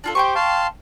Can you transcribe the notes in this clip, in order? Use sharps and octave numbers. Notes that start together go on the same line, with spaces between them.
D4 F4 A4
G4 C5 G5 G#5 C#6
F5 A5 C6